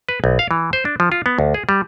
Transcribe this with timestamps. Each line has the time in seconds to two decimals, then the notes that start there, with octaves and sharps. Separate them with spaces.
0.09 B4
0.24 B1
0.39 F5
0.51 E3
0.73 C5
0.85 D4
1.00 F3
1.12 F4
1.26 B3
1.39 D2
1.54 G#4
1.69 G3